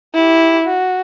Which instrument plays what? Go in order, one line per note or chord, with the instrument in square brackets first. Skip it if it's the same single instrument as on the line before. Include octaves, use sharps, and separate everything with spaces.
[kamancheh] E4 G4
F#4